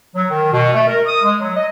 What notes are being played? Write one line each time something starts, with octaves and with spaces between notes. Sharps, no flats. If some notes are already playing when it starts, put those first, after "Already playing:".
F#3
D#3
B2
A3
A#4
D#6
G#3
F#3
D#5